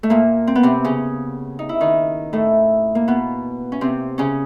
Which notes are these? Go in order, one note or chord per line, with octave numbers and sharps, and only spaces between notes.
A3
A#2 A#3
C4
B3
C3 C4
C#3 C#4
D#4
E4
D#3 D#4
A2 A3
A#3
B2 B3
C#4
C3 C4
C#3 C#4